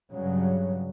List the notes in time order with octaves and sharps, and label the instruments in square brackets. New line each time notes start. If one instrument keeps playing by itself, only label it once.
[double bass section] G2 C#3 F#3